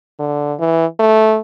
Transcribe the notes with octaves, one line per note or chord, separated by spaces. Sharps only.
D3
E3
A3